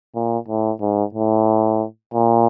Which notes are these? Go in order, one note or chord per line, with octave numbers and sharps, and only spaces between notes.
A#2
A2
G#2
A2
A#2